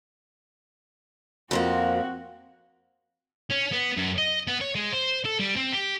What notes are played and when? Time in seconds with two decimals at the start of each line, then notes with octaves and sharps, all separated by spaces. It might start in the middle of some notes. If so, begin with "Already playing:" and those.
1.51 F2 F3 A#3 C4 F#4
3.50 C#4
3.71 B3
3.97 F#2
4.18 D#5
4.47 B3
4.61 C#5
4.75 G#3
4.93 C5
5.25 A4
5.39 G3
5.56 C4
5.72 G4